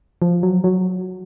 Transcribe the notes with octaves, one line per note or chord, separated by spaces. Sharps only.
F3
F#3
F#3